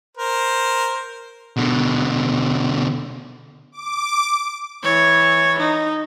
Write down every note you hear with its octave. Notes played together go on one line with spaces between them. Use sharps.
A#4 C5
B2 D3
D6
E3 C#5
D#4